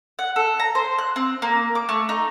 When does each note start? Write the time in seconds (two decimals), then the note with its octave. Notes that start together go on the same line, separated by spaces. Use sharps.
0.19 F#5
0.36 A4
0.60 A#5
0.75 C5
0.98 F#6
1.16 C4
1.42 A#3
1.75 D6
1.89 A3
2.09 D#4